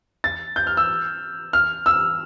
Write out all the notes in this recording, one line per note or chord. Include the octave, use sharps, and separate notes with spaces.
A6
G6
F6
E6
F6
E6